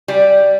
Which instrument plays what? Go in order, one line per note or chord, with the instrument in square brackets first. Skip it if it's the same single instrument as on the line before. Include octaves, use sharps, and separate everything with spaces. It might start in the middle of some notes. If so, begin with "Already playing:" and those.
[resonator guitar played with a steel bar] G3